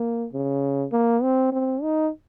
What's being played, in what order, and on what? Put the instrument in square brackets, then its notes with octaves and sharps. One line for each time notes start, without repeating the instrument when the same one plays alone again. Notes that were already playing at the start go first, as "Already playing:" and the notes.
Already playing: [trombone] A#3
C#3
A#3
C4
C4
D#4